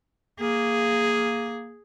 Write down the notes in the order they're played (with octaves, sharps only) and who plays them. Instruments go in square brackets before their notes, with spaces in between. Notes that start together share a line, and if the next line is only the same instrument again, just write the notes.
[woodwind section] A#3 [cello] G#4